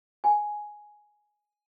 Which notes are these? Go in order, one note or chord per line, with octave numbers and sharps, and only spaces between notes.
G#5